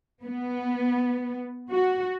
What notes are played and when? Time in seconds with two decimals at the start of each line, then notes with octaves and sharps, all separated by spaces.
0.23 B3
1.70 F#4